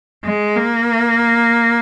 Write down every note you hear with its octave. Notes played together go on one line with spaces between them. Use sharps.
G#3
A#3